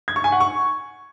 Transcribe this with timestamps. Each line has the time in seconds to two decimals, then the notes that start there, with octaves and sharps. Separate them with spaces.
0.08 G#6
0.16 C#6
0.24 G#5
0.32 F#5
0.40 C#6